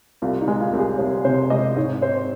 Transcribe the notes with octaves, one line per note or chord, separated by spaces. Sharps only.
C2 F4
D#4
G#3
F4
C2
G#4
C2 C5
C3 C5
G#3 D#5
G#2 C#5
C4 C5